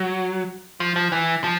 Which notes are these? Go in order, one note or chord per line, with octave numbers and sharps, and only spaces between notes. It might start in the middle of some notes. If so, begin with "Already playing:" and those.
Already playing: F#3
F3
F3
E3
F3